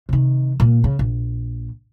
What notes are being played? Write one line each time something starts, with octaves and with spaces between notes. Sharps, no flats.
C3 D#3
A#2 A#3
C#3
A#1